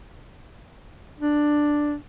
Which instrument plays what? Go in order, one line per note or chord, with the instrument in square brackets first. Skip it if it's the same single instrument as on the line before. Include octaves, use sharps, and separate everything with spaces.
[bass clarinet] D4